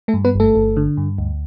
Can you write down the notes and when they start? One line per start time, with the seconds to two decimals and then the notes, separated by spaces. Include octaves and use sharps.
0.08 A3 A4
0.14 G2
0.25 B3 B4
0.35 G1
0.40 A3 A4
0.56 G1
0.77 D3
0.97 G2
1.18 D2